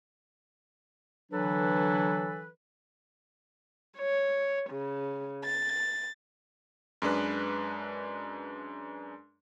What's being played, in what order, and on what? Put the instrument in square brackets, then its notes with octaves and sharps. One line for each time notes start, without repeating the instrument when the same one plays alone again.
[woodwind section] D3 E3 F#3 D4 A4 B4
[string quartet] C#5
C#3
A6
[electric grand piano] F#2 G#3 D4 B4